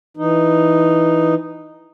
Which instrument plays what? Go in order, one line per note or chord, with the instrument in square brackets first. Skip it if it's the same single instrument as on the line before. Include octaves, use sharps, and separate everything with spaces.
[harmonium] E3 D#4